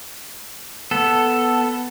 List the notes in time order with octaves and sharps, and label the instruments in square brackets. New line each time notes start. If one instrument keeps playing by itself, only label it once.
[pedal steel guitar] B3 A4